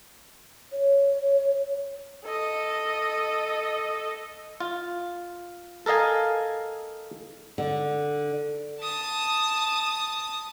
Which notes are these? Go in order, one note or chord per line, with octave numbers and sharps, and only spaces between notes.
C#5
A4 D#5
F4
A4 A#4 D#5 F5 G#5
D3
A5 D#6